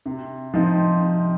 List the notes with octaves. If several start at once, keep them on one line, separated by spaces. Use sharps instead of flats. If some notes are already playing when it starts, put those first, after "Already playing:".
C3
F3 C4 D#4
C3